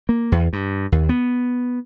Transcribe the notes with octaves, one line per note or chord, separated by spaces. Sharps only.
A#3
E2
G2
D#2
B3